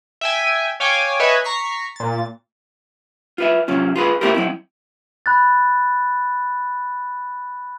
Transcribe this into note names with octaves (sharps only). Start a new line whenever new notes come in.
E5 G5 G#5
C#5 F5 G5 G#5 D6
B4 C#5 D#5 E5 G#5
A#5 C#6 B6 C7
A#2 A6
F4 B4 E5
C3 F#3 C#4 F4
F4 G#4 B4
A3 C4 E4 F4 G4 A#4
F#3 C4 E4
B5 F#6 A6